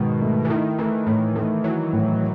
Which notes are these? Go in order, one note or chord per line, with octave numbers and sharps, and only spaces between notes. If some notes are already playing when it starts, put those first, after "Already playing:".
Already playing: G#2 B2 D#3
A3
E3
D#3 E4
E3 A3
A2 D#3
D#3 A3
F#3 E4
A2